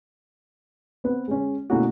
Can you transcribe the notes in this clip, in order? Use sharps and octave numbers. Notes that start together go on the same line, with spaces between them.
B3 C4 B4
G#3 C#4
B2 A3 A#3 C#4 E4 F#4